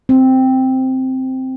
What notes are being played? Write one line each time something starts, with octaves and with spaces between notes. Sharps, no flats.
C4